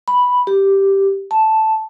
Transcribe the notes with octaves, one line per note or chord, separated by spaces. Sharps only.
B5
G4
A5